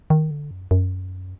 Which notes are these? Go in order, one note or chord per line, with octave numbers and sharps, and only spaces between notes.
D#3
D3
F#2
F#2